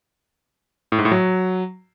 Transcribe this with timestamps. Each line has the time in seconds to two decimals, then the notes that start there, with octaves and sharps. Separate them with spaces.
0.92 A2
0.98 G#2
1.05 A2
1.12 F#3